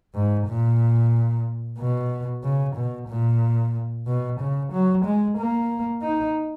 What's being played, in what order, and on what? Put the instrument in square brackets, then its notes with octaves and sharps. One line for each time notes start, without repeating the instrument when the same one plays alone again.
[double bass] G#2
A#2
B2
C#3
B2
A#2
B2
C#3
F#3
G#3
A#3
D#4